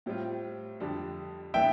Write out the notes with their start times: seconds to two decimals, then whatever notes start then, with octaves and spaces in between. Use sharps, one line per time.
0.06 A2 G3 C4 F4
0.80 F2 D3 G3 D4
1.54 A2 E3 B3 D4 E5 G5